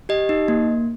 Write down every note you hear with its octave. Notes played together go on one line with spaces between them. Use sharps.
G4 D#5
D#4
A#3